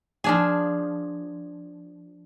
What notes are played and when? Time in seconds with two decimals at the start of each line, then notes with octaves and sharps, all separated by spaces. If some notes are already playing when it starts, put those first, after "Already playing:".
0.24 F3 D4 G#4